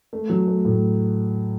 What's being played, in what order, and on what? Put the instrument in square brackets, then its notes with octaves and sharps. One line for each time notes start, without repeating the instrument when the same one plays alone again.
[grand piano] A3
F#3
A3
A2